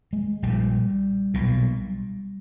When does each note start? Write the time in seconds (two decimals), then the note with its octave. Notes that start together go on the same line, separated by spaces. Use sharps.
0.13 G#3
0.42 A#1 A#2 G3
1.34 B1 A#2